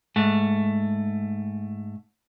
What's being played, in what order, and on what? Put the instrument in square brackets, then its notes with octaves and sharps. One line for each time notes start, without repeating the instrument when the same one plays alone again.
[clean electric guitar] G#2 A3